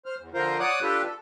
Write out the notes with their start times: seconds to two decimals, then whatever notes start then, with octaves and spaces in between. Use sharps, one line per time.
0.06 C5 F6
0.18 E2
0.34 D3 F3 F4 A#4 C5
0.60 C#5 D5 F#5 D6 D#6 F#6
0.82 D4 F4 G4 A4 B4
1.06 A4